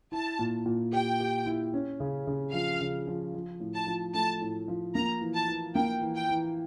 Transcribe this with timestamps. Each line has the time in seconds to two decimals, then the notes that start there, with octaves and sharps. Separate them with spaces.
0.12 E4 A5
0.39 A#2
0.66 A#2
0.92 G4 G5
1.20 G4
1.46 E4
1.74 C#4
2.00 C#3
2.27 C#3
2.53 F3 F5
2.81 C#3
3.07 F3
3.34 F3
3.60 A2
3.74 A5
3.87 F3
4.14 A3 A5
4.41 A2
4.68 F3
4.95 A#3 A#5
5.22 E3
5.35 A5
5.48 E3
5.75 A#3 G5
6.02 E3
6.15 G5
6.29 E3